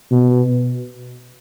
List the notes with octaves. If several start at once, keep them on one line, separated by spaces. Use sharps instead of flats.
B2